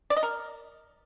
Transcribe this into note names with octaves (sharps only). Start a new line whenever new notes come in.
D5
D#5
A#4